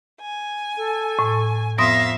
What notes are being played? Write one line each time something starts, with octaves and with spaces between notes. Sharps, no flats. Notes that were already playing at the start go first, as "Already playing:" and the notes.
G#5
A4
A2
F2 B3 E5 F5 C6 D#6 A#6